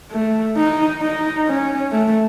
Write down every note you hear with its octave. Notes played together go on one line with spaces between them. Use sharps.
A3
D#4
D#4
C#4
A3